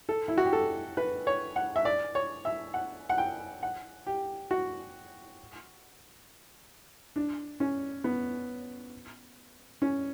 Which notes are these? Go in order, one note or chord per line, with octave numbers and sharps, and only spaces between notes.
A4
E4
F#4
G4
A4
B4
C#5
F#5
E5
D5
C#5
E5
F#5
F#5
G5
F#5
G4
F#4
D4
C#4
B3
C#4